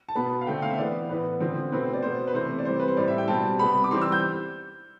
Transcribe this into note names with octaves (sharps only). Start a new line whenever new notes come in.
A5
B2 B3 B5
F5
D3 A3 C4 G5
F5
E5
E3 B3 D5
A2 E3 B3 B4
D3 F3 C4
B2 A3 C4 B4
C5
D5
B2 B3 C5
B4
C3 E3 A3 C5
D5
C3 E3 G3 C5
B4
C5
A2 G3 C4 D5
E5
G5
B2 G3 C4 A5
C3 G3 B3 B5
D6
E3 G3 C4 C6
E6
G6